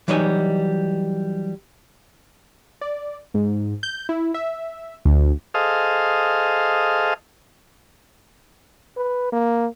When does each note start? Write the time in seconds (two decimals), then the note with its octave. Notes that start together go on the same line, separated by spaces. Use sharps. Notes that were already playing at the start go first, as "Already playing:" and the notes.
0.08 E3 F#3 G3 D#4 D#5 G#5
2.81 D5
3.34 G#2
3.83 G6
4.09 E4
4.34 E5
5.05 D2
5.54 G#4 A4 C5 D#5 F5
8.97 B4
9.32 A#3